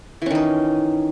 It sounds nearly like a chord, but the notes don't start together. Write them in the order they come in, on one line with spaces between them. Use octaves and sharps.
E3 C#4 D#3 D#4